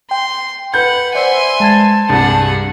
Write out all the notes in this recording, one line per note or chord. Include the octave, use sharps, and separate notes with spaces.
G5 C6
B4 F#5 G6
C5 D5 E5 F#5 G#5 C6
G#3 A5 G#6
C2 G2 D4 G#4 F#5